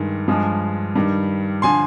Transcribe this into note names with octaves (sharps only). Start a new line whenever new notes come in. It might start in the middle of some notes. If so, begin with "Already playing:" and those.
Already playing: G2 D#3 G#3
G2 F3 G#3
G2 D#3 G3
D3 F3 G#5 C6